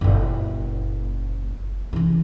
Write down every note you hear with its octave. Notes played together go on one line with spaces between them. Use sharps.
F#1 A#2
C#3 E3